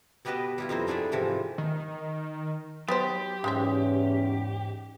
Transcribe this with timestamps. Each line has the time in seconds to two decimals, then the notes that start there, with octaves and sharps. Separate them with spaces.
0.25 B2 B3 G4 B4 D#5 A5
0.58 G3 E4 F4
0.69 F2 D#4 E4 C5
0.87 A3 D4 G#4 A4 D5 E5
1.12 G#2 C3 E3 F3
1.58 D#3
2.88 F#3 B3 D#4 G4 C5
3.44 E2 G#2 G#3 C#4 C5 E5